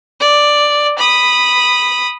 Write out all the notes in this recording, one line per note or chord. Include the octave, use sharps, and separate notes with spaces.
D5
B5 D#6